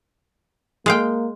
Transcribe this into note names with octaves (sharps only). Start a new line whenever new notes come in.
G#3 A#3 F5 G5